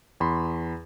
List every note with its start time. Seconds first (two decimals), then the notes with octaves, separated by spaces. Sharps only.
0.20 E2 B5 C6